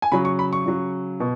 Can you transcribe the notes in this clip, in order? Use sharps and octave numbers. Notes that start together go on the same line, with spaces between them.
G#5
C#3 F#3 B5
C#6
B5
C#6
C#3 F#3
B2